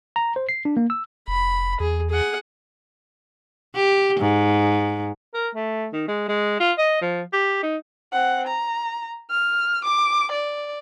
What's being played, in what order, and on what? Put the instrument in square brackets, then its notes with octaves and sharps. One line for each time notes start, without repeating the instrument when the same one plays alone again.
[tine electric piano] A#5
C5
C7
D4
A#3
E6
[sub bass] F1 [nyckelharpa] B5
[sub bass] E2 [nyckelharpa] G#4
[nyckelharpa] G#4 F#5
[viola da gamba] G4
G#2
[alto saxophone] A#4
A3
D#3
G#3
G#3
F4
D#5
F3
G4
D#4
[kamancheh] C4 F#5
A#5
F6
D6
D5